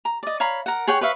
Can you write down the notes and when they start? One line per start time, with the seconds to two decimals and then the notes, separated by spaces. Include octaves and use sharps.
0.05 A#5
0.23 D5 D#5
0.40 C#5 F5 A#5 B5
0.66 A#4 F#5
0.88 G#4 C#5 F#5 G5
1.01 B4 C#5 E5 F5